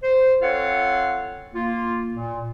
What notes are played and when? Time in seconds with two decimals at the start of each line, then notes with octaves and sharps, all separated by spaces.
0.02 C5
0.42 C4 F4 A4 C#5 F5 F#5
1.55 A#3 F4
2.14 A#2